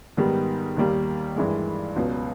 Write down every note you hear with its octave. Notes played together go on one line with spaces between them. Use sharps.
G#2 D#3 G3 B3
D#2 D#3 G3 A#3
G2 E3 G#3
C#2 B2 F#3